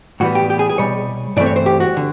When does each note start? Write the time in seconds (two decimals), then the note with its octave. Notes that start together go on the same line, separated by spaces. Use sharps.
0.20 A2 E3 G3 B3 F#4
0.35 G4
0.50 G4
0.59 G#4
0.69 G#4
0.78 C2 B2 G3 C#5
1.37 G2 E3 A3 C4 D5
1.46 C#5
1.56 C5
1.66 G4
1.80 F#4
1.97 D3